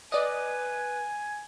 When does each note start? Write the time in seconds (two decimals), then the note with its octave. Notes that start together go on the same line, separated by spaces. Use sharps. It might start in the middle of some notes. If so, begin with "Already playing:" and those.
0.12 B4 D5 D#5 G#5